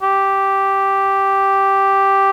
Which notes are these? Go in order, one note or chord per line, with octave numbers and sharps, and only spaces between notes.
G4